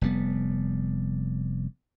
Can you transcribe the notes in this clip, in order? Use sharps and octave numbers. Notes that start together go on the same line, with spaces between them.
F1 G3 B3